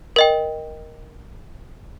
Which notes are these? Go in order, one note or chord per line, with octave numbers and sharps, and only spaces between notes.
A#4 D#5 G5